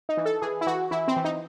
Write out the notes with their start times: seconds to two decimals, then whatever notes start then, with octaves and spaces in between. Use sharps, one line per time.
0.09 D#4
0.17 E3
0.25 A4
0.42 E3 G#4
0.61 E4
0.67 E3 F#4
0.91 E3 E4
1.08 C4
1.17 E3
1.25 D#4